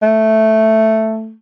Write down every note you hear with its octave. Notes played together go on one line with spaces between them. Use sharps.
A3